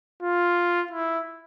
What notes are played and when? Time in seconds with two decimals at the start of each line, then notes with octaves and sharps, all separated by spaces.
0.23 F4
0.91 E4